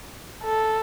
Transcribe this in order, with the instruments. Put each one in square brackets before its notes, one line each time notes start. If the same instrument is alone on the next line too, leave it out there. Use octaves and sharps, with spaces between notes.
[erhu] A4